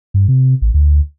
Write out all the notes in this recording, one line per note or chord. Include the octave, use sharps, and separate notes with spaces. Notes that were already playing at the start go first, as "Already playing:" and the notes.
G2
C3
A1
D2